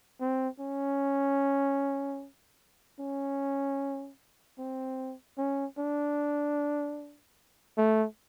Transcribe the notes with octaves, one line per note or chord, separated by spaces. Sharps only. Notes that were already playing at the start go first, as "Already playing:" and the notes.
C4
C#4
C#4
C4
C#4
D4
A3